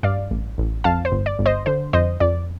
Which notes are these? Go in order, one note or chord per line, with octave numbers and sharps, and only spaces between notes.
G2 D5 F5
A1
A1
F2 F5 A5
C5
G1
D5
G1
C5 D#5
D3 C5
F2 C5 D#5
F2 D5